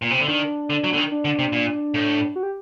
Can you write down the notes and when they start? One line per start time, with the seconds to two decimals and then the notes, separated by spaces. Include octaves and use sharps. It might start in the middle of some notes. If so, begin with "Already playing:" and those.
0.02 A#2
0.11 C3
0.20 D3
0.28 D#3 D4
0.70 D3
0.84 F#3
0.93 D3
0.98 D#3
1.12 D4
1.25 D3
1.39 C3
1.52 A#2
1.94 A2
2.36 F#4
2.43 G4